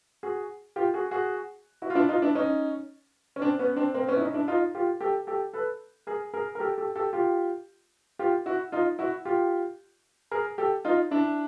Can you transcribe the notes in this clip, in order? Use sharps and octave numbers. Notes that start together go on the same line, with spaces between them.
F#4 G#4
F4 G4
F#4 G#4
F#4 G#4
E4 F#4
F4
D4 E4
D#4 F4
D4 E4
C#4 D#4
C#4
C4 D4
B3 C#4
C4 D4
A#3 C4
B3 C#4
E4
C#4 D#4
D4 E4
D#4 F4
F4 G4
G4 A4
G4 A4
A4 B4
G#4 A#4
G#4 A#4
A#4
G4 A4
G4 A4
G4 A4
F4 G4
F4 G4
E4 F#4
D#4 F4
E4 F#4
F4 G4
G#4 A#4
G4 A4
D#4 F4
D4 E4